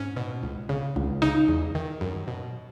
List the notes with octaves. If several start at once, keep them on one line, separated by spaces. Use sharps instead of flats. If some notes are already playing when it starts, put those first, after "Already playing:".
Already playing: G#2 C#4
B2
C#2
C#3
C#2
C#3 D#4
E2
D#3
F#2
B2